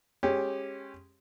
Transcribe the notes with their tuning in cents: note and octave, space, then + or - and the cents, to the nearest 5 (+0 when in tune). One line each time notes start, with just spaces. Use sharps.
G#3 +0 C#4 -20 G4 +0